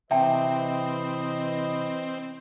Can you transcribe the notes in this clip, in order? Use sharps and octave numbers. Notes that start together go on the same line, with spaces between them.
C3 E3 C4 B4 D#5 E5 G5 A5